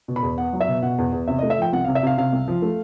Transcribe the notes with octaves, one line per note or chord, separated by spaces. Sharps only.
B2
B5
E2
B3 F#5
F#3
E5
B2
B2 F#5
E2
E2
C3 E5
D#5
A3
E5
F3 G5
C2 F#5
F5
C3
E5
C3 F5
C3 F5
C2
F3
A3